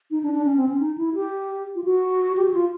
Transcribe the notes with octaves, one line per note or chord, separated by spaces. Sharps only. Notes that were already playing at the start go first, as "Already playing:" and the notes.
D#4
D4
D4
C#4
C4
C#4
D#4
E4
G4
F4
F#4
G4
F#4
F4